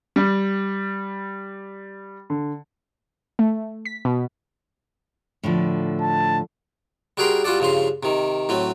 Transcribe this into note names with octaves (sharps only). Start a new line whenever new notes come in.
G3
D3
A3
B6
B2
A2 D3 F3
A5
G3 F#4 G#4 A#4 G5 C6
G3 F4 F#4 A4 D5
G2 C#3 F3 C6
C3 D#3
A2 F#3 C4